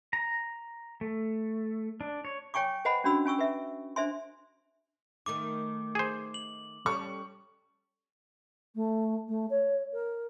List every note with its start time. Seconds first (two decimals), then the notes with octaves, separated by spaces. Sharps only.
0.13 A#5
1.01 A3
2.01 D4
2.25 C#5
2.54 C#5 G5 G#5 C#6 D6
2.85 B4 C5 D#5 F#5 G#5 B5
3.04 C#4 D4 F#4 B5 E6
3.25 C#4 G#5 C#6 E6
3.39 B4 E5
3.96 D4 C5 E5 G#5 C6
5.26 D#3 A3 D#4 D6
5.95 G#4 C5
6.34 F#7
6.86 G3 C#4 A4 C#6
8.75 A3
9.28 A3
9.50 C#5
9.93 A#4